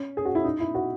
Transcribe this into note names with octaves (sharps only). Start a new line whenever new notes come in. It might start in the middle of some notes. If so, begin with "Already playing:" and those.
Already playing: C#4
G#4
F#4
E4
D#4
E4
F#4